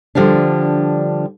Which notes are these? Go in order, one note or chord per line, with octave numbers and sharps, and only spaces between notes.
D3 F3 G3 D4